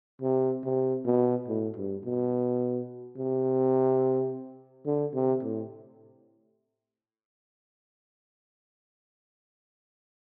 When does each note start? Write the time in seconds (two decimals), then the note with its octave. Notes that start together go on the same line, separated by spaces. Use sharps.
0.22 C3
0.65 C3
1.06 B2
1.48 A2
1.76 G2
2.05 B2
3.17 C3
4.86 D3
5.14 C3
5.43 A2